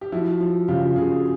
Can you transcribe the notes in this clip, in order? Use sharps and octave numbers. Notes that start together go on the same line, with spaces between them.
G4
F3 E4 F#4
F3
C#3 F4 G4
C#3 F#4 G#4